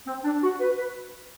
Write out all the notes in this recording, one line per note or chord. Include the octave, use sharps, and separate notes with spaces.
C4
D4
F#4
B4
B4